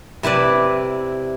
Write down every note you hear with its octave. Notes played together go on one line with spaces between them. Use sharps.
C3 E4 B4 D5